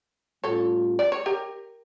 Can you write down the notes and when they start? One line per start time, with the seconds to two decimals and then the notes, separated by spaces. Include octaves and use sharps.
0.44 A2 G3 C#4 F4 A4 C#5
0.99 D5
1.12 C#5
1.26 G4 A#4